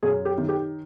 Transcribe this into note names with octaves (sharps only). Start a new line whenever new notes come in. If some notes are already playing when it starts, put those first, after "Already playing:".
F#2 G#4
G4
D#3
G4